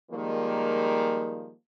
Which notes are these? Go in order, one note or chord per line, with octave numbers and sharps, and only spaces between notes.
D#3 F3 G3 G#3 A#3